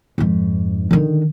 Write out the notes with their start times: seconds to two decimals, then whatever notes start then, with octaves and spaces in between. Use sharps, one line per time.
0.18 F2 G#2
0.91 D3 D#3